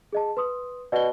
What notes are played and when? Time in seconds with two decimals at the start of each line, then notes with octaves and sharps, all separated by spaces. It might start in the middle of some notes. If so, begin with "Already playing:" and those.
0.13 G#4 D#5 A5
0.37 B4 C6 D#6
0.92 B2 D5 G7